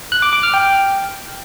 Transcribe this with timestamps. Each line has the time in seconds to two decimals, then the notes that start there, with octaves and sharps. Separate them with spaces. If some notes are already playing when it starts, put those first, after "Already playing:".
0.12 F#6
0.22 D6
0.33 D6
0.43 F6
0.54 G5